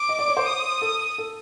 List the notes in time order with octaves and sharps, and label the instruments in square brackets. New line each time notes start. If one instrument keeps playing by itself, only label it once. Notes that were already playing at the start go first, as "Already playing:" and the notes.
Already playing: [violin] D6
[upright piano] D#5
D5
C#5
C5
[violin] D#6
[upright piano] A4
A4